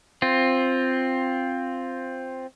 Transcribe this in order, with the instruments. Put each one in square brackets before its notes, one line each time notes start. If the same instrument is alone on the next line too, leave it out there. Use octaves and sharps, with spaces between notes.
[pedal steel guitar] C4 F4